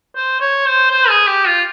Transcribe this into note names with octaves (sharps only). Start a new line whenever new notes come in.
C5
C#5
C5
C5
G#4
G4
F4